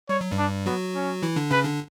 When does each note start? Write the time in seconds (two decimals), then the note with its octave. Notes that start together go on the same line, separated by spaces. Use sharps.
0.09 G3 C#5
0.21 F#3
0.32 G2 G3
0.38 D4
0.66 F#3 B3 F#4
0.95 C#4
1.22 E3 E4
1.36 D3 D4
1.51 C#3 C#4 B4
1.65 D3 D4